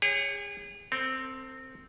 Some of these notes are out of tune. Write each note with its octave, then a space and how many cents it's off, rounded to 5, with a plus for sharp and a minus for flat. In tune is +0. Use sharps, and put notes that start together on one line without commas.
G#4 -35 C#5 +5 G5 +0
C4 +0 A4 +45